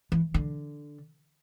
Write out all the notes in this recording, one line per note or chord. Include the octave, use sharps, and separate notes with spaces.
E3
D3